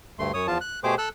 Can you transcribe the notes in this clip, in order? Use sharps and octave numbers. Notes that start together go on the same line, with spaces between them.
D2 G2 A3 C6
F#2 C#5 D#6
E2 F3 F4 A5
F#6
B2 A3 G4 G#4 C5 D6
A4 E6 F#6